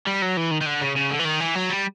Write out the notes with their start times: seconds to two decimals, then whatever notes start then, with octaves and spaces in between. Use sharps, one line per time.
0.07 G3
0.22 F#3
0.37 E3
0.51 D#3
0.61 D#3
0.66 D3
0.82 C#3
0.96 C#3
1.11 D3
1.19 E3
1.25 D#3
1.40 E3
1.55 F#3
1.70 G3